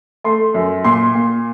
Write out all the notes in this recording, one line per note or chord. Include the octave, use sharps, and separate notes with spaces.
A3 C6
F#2
A#2 C6
A#2